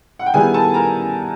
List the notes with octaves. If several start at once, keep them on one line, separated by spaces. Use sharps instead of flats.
F#5
G5
D#3 G3 B3 E4 G#4 G#5
A4 A5
A#4 A#5